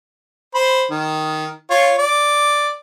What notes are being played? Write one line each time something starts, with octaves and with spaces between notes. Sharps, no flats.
C5 B5
D#3
F4 C#5
D5